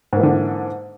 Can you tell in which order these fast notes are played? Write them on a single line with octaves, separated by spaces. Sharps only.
G#2 A#3 E3 D3